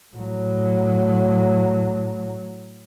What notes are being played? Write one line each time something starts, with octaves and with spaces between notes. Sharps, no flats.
A2 F#3